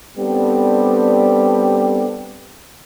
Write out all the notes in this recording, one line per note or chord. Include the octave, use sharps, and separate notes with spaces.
G3 B3 C4 D4 G4 A4